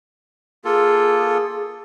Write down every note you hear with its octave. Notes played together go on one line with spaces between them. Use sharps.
A#3 F4 G#4 A4